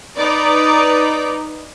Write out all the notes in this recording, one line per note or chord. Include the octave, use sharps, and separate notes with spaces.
D#4 B4 D5